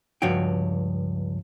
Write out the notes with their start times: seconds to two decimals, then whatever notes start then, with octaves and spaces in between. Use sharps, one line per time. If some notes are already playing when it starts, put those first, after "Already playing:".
0.22 C#2 G2 F3 F#4 C#5 G5